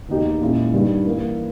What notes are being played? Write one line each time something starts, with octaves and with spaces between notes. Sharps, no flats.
E2 D#3 A#3 D#4 G4
A#2 G#3 C#4 E4
G2 D#3 G3
E3 A#3 E4